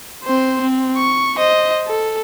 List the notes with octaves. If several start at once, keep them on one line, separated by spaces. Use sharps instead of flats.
C4 C5
C4
C#6
C5 D#5
A4